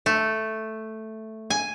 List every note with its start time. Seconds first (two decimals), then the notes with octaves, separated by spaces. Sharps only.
0.06 A3
1.50 G#5